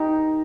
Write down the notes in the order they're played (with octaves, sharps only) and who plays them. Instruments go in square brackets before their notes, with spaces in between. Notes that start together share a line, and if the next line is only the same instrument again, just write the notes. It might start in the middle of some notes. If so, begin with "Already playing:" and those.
Already playing: [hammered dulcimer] D#3 D#4 G4